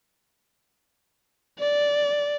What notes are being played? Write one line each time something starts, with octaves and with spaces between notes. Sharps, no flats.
D5